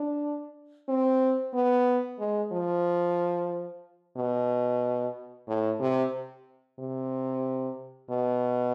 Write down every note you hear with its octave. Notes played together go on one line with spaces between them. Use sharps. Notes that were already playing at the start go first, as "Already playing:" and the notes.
Already playing: D4
C4
B3
G#3
F3
B2
A2
C3
C3
B2